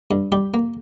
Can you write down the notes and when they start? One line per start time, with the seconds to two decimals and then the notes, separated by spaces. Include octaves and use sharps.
0.11 G2
0.32 G3 G4
0.54 A#3